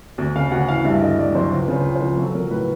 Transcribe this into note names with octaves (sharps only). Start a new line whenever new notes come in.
D2
C#3 F5
D2 F#5
E3 F5
G2 E5
D3 D#5
G2 D5
F#3 C5
C#2 B4
C#3 C5
C#2
C5
F3
F#3 A4
F#3 A#4
A2 B4